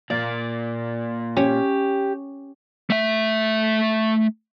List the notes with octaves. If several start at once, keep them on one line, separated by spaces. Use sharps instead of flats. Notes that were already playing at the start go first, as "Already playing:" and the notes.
A#2 A#3 D5
C#4 G4
A3 E5